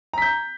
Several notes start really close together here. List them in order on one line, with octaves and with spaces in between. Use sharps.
A#5 B6 G6